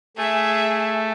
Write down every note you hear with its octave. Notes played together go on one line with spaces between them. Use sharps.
A3 G#4 E5